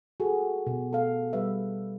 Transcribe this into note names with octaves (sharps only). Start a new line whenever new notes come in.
F#4 G#4 A4
B2
A4 F5
G3 B4 E5